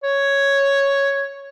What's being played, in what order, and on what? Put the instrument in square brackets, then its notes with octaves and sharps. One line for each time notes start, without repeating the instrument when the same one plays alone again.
[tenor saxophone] C#5